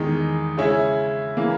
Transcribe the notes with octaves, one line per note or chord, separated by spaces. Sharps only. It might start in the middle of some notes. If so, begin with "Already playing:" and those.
Already playing: E2 D#3 G#3 D#4
C#3 G#3 C#4 E4
C#3 E3 A#3